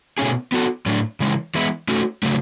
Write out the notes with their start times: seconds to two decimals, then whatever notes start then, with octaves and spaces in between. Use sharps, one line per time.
0.18 B2 A3 C#4 G#4
0.52 B3 F#4 A4
0.86 A2 F#3 A3 D4
1.20 C#3 E3 G#3
1.55 E3 G#3 B3 E4
1.88 A3 C#4 F#4 A4
2.23 C#3 F#3 A3